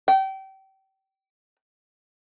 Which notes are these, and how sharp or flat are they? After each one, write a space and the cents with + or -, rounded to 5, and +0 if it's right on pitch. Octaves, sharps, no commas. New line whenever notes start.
G5 -30